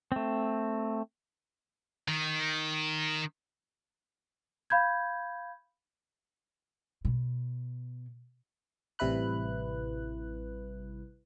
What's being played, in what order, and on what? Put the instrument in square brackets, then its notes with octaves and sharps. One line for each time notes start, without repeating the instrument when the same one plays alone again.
[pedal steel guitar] A3 C4
[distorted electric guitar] D#3
[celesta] F5 B5 G6 G#6
[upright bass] B2
[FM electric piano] A1 C3 G3 E4 B4 F#6